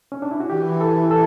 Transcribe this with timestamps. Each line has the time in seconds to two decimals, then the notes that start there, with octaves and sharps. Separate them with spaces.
0.12 C#4
0.22 D4
0.31 E4
0.40 F#4
0.50 E3 G4
0.81 A4
1.11 A4